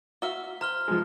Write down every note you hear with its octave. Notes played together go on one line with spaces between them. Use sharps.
F#4 E5 F5 G7
C5 A#5 F6 G7
F3 G#3